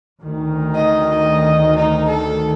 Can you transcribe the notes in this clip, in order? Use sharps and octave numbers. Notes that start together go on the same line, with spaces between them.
D2 D#3
D#5
D#4
A4